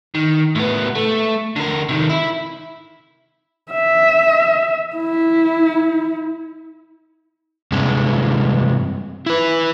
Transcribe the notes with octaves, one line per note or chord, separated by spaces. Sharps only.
D#3
A2 B3
A3
D3 A#4
C3 D#3
E4
E5
E4
G2 C3 G#3
E4 B4